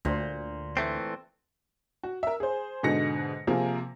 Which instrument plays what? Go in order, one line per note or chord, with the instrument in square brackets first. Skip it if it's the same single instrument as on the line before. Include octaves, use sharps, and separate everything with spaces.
[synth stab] D2 [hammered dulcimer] A#2 C5
[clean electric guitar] E3 A3 C4
[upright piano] F#4
A#4 E5
G#4 C5
G#2 B2 D3 D#5 A#6 C#7
C3 F3 A#3 G#4 A#4